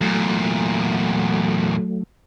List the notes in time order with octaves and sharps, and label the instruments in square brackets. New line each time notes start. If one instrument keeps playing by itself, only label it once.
[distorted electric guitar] E2 A#2 [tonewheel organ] F#3 A3